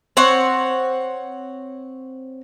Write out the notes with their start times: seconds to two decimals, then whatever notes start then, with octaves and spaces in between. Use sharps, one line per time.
0.17 C4 C#5 F#5